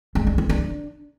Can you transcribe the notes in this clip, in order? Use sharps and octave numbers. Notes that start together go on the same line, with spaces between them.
G#3
D4
E4
D4